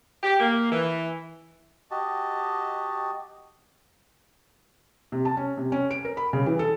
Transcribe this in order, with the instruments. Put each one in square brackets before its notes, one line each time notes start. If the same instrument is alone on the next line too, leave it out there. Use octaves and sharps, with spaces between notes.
[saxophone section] G4
A#3
E3
[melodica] F#4 G4 D#5 A5
[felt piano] C3
A5
C#4
C3
C#4
D7
A#4
B5
C#3
E3
A4